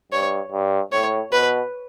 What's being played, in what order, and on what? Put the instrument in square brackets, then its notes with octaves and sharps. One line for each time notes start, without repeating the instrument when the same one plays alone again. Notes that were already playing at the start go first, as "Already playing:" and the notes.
[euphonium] G2 [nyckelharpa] C#5
[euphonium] G2
[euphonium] A2 [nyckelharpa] C#5
[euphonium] B2 [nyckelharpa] B4